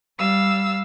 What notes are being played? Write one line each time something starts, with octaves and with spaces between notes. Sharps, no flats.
G3 F5 E6